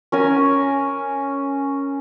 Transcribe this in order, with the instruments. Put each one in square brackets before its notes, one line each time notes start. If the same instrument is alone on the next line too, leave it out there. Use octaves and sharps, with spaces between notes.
[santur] C#4 A#4 G#5